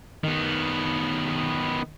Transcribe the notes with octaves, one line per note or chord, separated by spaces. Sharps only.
D#3 B3